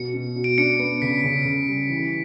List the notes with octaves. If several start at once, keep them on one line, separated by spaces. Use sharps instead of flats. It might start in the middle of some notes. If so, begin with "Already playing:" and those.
Already playing: B2 C#7
B2
B2
D7
D4 C#7
B3 C#7
C#3 B6
C#3
C#3
G3
E3